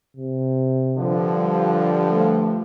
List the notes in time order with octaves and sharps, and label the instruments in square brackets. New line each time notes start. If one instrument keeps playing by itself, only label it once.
[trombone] C3
[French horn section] G2 D3 F3
[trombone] G3
A3